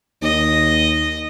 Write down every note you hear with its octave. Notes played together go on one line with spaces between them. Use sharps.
D#2 D#5